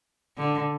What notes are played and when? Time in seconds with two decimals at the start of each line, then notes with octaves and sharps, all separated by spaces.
0.37 D3